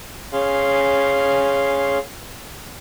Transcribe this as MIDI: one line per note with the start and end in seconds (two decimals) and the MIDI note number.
0.33 1.98 61
0.33 1.98 68
0.33 1.98 77
0.33 1.98 84